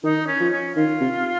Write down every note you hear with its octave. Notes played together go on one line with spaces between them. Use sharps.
D#3 D#4
C#4
F3
C#4
D#3 F4
C3